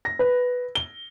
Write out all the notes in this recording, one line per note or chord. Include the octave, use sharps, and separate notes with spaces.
A#6
B4
G7